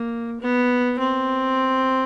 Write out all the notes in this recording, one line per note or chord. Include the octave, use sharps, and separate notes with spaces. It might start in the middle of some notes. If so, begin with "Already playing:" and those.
Already playing: A#3
B3
C4